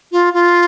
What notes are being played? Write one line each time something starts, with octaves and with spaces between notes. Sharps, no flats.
F4
F4